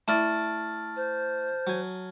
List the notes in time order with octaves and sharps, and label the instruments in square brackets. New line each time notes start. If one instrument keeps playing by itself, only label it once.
[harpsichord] A3 E4 D5 [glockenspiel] A5 F6 A6
[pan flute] C5
[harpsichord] F#3 G#5